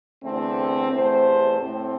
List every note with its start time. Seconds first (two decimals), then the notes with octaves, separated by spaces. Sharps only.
0.22 E2 D3 A3 C4
0.91 E2 C3 A3 C5
1.59 A2 A3 C4